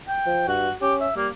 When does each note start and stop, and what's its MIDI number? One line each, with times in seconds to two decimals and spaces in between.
0.08 0.47 79
0.26 0.45 53
0.48 0.69 43
0.48 0.73 66
0.82 1.08 61
0.82 0.94 67
1.00 1.12 76
1.16 1.29 55
1.16 1.28 58